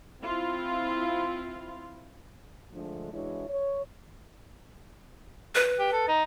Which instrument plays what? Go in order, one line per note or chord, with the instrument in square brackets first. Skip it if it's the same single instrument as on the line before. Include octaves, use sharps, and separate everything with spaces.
[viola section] C4 E4 F4
[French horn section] D3 F3 G#3 A3 D4
E3 G#3 D4 E4 F#4 C#5
C#5
[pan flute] B4
[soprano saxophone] G4
A4
D#4